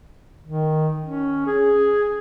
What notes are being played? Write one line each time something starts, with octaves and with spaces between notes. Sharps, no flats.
D#3
C#4
G#4